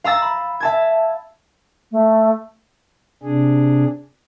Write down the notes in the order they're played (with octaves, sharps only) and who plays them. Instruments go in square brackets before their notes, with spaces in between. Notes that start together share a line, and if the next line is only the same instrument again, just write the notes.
[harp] F5 A#5 E6 A6
B5
E5 A5 G#6
[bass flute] A3
[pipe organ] C3 D4 G#4